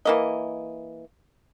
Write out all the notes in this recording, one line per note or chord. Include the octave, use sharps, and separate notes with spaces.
E3 A#3 D#5